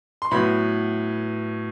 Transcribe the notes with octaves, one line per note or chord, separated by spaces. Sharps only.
C6
A2 F#3 B3 B5